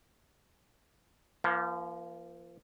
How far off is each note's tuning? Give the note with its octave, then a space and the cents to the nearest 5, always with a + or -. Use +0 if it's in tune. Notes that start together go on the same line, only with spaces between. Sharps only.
F3 -30 A#3 +20